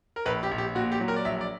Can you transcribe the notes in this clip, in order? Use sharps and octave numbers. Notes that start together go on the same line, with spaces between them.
A#4
A#1 B4
G4
A#1
G4
A#2 F#4
G4
F#3
A#4
D5
A#1 E5
D5